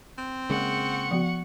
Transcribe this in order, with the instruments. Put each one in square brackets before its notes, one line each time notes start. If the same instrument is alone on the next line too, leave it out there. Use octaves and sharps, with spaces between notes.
[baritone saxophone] C4
[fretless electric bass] C#3 G#3 A#3 [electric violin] F#5 C#6
[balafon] F3 B3 F#4